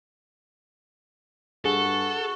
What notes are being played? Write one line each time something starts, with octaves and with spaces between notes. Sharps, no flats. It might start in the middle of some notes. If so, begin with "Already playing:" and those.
G2 F#4 G#4 A4 C#6 F#6